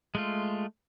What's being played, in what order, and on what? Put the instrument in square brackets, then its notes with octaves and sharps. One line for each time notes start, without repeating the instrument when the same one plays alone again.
[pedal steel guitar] G#3 A3 F4